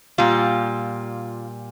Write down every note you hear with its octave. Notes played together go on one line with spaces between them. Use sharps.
A#2 G3 F4